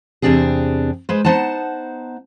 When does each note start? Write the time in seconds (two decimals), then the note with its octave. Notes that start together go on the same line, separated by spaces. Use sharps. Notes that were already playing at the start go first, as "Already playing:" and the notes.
0.22 E2 C3 C4 D4 G4 G#4
1.09 G#3 B4 C5
1.25 B3 D#4 C5 F#5 A5